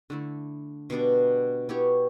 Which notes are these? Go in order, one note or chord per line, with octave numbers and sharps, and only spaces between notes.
D3 A3 E4
B2 G3 B3 D4
B3 E4 G4 C#5